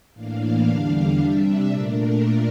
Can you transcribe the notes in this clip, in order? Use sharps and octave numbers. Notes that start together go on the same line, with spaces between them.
A2 E3 A#3 D4 F5
E2 D3 G3 D4
C3 G3 D4 E5
A#2 A3 D4 A#4